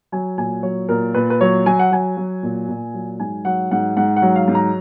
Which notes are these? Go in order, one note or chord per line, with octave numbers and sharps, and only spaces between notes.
F#3 G#5
A#2 G#5
F#3 C#5
A#2 A#4
A#2 B4
B4
F#3 C#5
F#3 G#5
F#5
F#3 G#5
F#3
A#2
A#2
F#3
G#2 G#5
F#3 F#5
G#2 F#5
G#2 F#5
F#5
F#3
F5
G#2
A#5